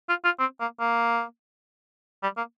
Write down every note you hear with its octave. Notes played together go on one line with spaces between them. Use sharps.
F4
F4
C4
A#3
A#3
G3
A#3